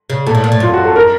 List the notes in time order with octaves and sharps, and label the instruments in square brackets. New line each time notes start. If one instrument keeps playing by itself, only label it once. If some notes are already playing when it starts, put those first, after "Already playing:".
[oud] C#3
[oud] A#2 [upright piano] A4
[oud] A2
A#2
A2
[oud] F#2 [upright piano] F4
[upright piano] F#4
A4
A#4